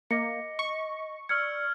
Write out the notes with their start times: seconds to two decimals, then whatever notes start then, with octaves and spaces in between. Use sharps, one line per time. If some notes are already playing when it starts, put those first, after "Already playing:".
0.11 A#3 D#5 D6 A#6 C#7
0.59 C#6
1.29 D5 E6 F6 G#6 C#7